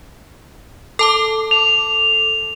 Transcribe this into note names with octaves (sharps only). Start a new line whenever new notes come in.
A4 A5 D6
F7